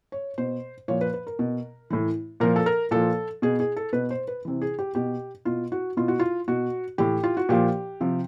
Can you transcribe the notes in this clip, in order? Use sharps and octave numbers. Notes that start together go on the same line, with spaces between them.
C#5
B2 C5
A#2 F3 C#5
B4
B4
A#4
B2
A2 E3
A#2 F3 A#4
A4
A#4
A#2 F3 A4
B2 G#4
G#4
A4
B2 B4
C5
B4
C3 E3
G#4
G4
B2 G4
B2 F4
F#4
B2 F4
F#4
F4
B2 F#4
A2 E3 G4
F4
F#4
A#2 F3 G4
C3 F3